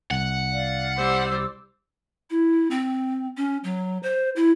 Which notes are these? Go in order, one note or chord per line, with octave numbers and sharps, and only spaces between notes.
C2 F#5
D5 F5
G3 C5 D6 E6
E4
C4
C#4
F#3
C5
E4